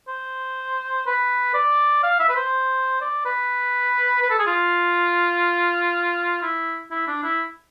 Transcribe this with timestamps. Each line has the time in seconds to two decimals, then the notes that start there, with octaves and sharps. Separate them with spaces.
0.08 C5
1.06 B4
1.54 D5
2.03 F5
2.19 E5
2.29 B4
2.36 C5
3.01 D5
3.25 B4
4.22 B4
4.30 A4
4.39 G#4
4.47 F4
6.42 E4
6.91 E4
7.08 D4
7.24 E4